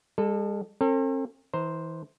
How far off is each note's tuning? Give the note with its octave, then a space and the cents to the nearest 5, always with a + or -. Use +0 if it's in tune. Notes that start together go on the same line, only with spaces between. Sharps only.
G#3 -45 A4 +0
C4 +45 A4 +40
E3 -30 C5 +0 A#5 -10